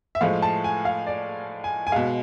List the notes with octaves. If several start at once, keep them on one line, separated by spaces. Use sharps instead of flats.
E5
A2 F3 G#3 F5
A5
G#5
F5
D5
G#5
G#5
B2 G#3 F5